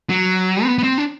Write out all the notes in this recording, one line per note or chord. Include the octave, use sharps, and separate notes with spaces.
F#3
C4
B3
B3
C4
D4